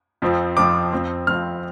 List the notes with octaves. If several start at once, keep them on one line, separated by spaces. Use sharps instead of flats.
F2 F3 C4 F4
F2 F3 C4 F4 D6
F2 F3 C4 F4
F2 F3 C4 F4 F6